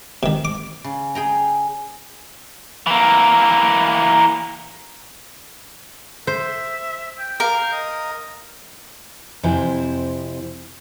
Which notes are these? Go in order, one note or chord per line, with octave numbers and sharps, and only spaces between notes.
C3 D#3
D6
C#3
G#4 G5 A#5
E3 A#3
C5 E5
G5
A#4 F5
D#5
F2 C3 E4 C5 G#5